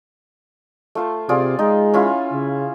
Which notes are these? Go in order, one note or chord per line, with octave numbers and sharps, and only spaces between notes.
A3 F4 C5
C3 F4 G#4 D5
G#3 D#4
C#4 E4 F4
C#3